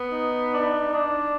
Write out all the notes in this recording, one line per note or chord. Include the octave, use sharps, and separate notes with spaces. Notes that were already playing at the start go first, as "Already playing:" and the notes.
Already playing: B3
D#4
D4
D4